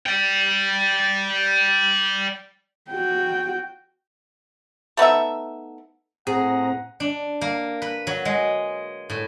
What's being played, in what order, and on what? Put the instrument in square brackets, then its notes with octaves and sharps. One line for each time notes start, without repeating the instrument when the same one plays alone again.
[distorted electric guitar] D5 G5
[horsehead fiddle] F#4 G5
[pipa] A3 B3 D#4 E5
[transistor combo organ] A2 C4 A#5 [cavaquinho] G#4 [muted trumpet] F#5
[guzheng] D4
A#3
B4
F#3
G#3
A2